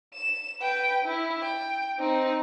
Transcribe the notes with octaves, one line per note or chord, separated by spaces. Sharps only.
E7
B4 G5
E4
G5
C4 D#4